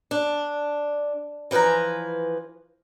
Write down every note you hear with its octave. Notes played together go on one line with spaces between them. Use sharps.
D4
E3 F3 B4 G#5 A#5